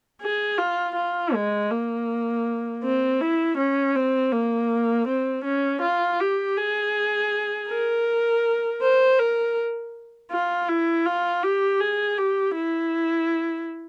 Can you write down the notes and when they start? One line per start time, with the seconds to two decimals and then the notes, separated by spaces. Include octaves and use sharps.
0.22 G#4
0.58 F4
0.96 F4
1.34 G#3
1.71 A#3
2.84 C4
3.21 E4
3.58 C#4
3.95 C4
4.32 A#3
5.08 C4
5.45 C#4
5.82 F4
6.21 G4
6.58 G#4
7.70 A#4
8.82 C5
9.19 A#4
10.32 F4
10.69 E4
11.06 F4
11.43 G4
11.81 G#4
12.18 G4
12.55 E4